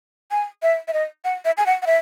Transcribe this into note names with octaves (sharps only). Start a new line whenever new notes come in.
G#5
E5
E5
D#5
F#5
E5
G#5
F#5
F#5
E5